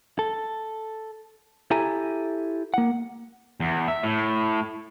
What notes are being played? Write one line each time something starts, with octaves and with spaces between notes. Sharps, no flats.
A4
E4 G4 A4 E5 G#5 A#5
A#3 F#5
E2
E5
A2